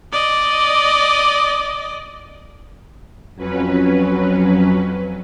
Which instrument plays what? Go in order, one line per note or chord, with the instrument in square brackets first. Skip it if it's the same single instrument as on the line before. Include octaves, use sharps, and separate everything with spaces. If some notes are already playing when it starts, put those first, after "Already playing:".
[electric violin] D5 D#5
[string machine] F2 F#3 C#4 B4